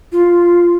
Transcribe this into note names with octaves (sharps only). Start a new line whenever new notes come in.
F4